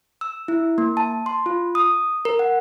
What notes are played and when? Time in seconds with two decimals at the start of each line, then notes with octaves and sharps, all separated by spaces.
0.21 E6
0.48 E4
0.78 A#3
0.97 A5
1.26 C6
1.46 F4
1.75 D#6
2.25 A#4
2.39 F#5